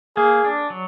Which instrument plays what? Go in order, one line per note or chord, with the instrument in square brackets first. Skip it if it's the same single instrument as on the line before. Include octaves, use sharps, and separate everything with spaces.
[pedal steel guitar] A#3 [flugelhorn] G#4
[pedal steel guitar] D4
F#3